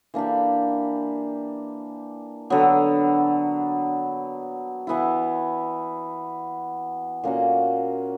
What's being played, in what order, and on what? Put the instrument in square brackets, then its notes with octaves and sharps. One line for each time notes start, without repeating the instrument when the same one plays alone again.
[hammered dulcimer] E3 A#3 D4 G4
D3 F#3 B3
E3 B3 E4
A#2 A#3 C#4 F#4